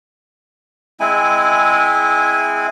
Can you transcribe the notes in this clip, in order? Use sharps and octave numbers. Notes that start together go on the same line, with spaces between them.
G#3 C4 E4 G#5